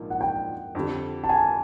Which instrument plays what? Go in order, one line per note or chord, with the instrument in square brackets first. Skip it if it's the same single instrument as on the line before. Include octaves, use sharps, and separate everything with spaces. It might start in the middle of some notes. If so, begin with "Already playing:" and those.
Already playing: [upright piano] A#1 G#2 F3 A#3
[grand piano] F#5
G5
[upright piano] F2 D3 G3
[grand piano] A5
G#5